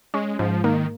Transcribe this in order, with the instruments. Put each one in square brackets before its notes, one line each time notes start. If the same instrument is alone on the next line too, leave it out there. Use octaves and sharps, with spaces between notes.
[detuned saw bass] G#3 [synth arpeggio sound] C#4
[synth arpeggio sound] G#2 [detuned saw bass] F3
[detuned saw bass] D#3 [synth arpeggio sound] A#3